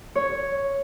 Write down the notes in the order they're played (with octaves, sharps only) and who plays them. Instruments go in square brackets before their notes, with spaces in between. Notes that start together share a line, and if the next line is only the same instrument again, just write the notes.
[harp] C#5